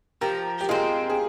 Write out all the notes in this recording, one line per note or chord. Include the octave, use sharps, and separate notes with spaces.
F3 G4 A#4
G4
G#3 C4 F4 G#4
G#4